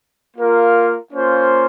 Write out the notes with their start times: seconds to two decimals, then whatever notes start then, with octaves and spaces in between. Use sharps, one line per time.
0.36 A#3 F4 A#4 F5
1.12 A#3 C#4 F4 C5